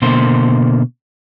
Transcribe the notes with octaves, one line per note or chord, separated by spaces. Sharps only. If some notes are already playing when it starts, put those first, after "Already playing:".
B2 D3 A#3 C5